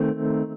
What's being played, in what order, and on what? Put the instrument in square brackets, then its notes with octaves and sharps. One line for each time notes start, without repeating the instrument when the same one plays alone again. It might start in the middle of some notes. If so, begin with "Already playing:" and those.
Already playing: [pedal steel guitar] D#3 A3 C4